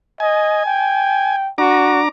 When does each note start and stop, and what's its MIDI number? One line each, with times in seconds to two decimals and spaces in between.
0.20 0.61 75
0.20 1.36 80
0.66 1.50 79
1.58 2.09 62
1.58 2.02 66
1.58 2.09 82
1.58 2.09 86